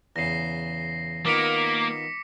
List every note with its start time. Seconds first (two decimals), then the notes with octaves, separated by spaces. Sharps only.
0.16 E2 C#3 A#6 C7
1.26 D#3 A#3 B3 F4 D6 B6 C#7